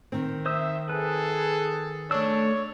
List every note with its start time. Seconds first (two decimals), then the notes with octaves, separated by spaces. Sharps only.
0.12 D#3 C4
0.46 C5 E5 D#6 E6
0.89 G#4 A4 B4
2.11 A3 D4 C#5 E6